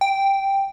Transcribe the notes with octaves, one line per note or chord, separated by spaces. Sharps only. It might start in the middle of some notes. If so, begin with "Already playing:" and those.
G5